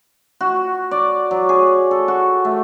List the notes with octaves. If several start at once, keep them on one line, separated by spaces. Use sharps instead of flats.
F#4
D5
F#3
G#4
A4
F#4
A3